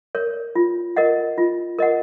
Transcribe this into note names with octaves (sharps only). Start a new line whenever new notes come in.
A#4 C#5
F4
A#4 D#5 F#5
F4
A#4 D#5 F#5